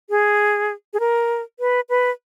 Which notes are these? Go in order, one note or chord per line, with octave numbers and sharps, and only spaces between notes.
G#4
G#4
A#4
B4
B4